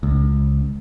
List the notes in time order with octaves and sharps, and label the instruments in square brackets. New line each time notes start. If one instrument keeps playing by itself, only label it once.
[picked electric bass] C#2